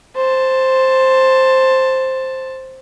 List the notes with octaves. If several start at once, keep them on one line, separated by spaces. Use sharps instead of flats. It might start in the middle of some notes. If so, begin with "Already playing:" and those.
C5 A5